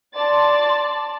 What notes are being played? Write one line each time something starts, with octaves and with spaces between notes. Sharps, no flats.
D5 A5 C6 A6